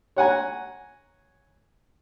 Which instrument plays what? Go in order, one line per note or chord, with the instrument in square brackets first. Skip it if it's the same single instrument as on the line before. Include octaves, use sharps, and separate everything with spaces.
[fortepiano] C#5 F#5 G#5 A#5